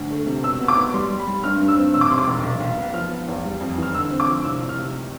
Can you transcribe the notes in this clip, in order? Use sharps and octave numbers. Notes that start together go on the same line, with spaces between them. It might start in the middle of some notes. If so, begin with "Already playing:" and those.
Already playing: D2
A3
C3
B2 E6
B3
D6
B3
G3 C6
G3
B5
G3
G2 F6
G2
E6
C4
E1 E6
D6
C3 C6
D6
E1
B1
B1
B3
F3 F6
B3
E2
G3
F2
E3
F6
D3 E6
C4
D6
F3
C2 E6
C2
F6
C3